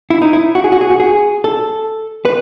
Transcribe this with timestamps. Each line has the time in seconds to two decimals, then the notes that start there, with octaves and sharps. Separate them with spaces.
0.10 E4
0.22 D#4
0.33 E4
0.55 F#4
0.64 G#4
0.72 F#4
0.81 G#4
0.90 F#4
1.00 G#4
1.44 A4
2.25 B4